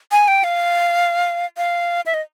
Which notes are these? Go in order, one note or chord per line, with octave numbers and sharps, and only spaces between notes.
G#5
G5
F5
F5
E5
D#5